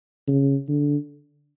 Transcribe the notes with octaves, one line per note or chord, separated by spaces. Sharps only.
C#3
D3